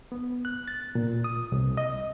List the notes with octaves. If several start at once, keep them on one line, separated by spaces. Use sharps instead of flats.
B3
F#6
A6
A#2
D#6
C2
D#5